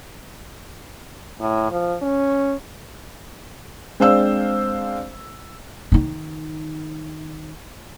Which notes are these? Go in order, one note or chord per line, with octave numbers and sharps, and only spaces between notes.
A2
F3
C#4
G#3 C4 D4 C5 F5 E6
D#3 D#4